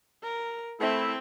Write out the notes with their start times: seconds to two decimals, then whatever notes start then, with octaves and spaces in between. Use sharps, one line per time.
0.23 A#4
0.80 A3 C4 E4